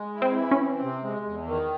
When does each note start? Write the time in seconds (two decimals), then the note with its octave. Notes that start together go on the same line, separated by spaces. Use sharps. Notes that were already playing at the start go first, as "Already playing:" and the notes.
Already playing: G#3
0.15 E4
0.22 C4
0.37 E3
0.51 C#4
0.59 C4
0.82 C3
1.03 G#3
1.26 E2
1.47 D#3